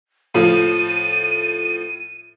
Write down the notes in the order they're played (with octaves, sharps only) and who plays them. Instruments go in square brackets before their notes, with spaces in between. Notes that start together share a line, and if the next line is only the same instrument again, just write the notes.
[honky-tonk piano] A2 F3 [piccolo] D#7